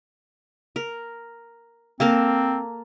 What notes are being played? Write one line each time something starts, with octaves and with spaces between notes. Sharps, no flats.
A#4
A#3 C4 A4 A#4